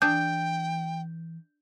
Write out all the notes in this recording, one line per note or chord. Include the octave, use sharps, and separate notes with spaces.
E3 D4 G#4 G5 G6